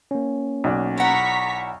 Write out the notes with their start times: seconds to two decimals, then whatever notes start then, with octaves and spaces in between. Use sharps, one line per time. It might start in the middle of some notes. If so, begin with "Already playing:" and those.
0.11 A#3 C#4
0.64 B1 F#4 D5
0.97 E4 F#5 A#5 C#6 B6